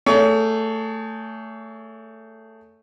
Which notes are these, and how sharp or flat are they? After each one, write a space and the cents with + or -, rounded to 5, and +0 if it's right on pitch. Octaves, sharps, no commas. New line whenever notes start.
A3 +15 G#4 +0 C#5 +35